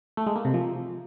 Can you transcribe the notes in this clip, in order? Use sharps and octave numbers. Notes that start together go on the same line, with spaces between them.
A3
G#3
A#3
C3
F3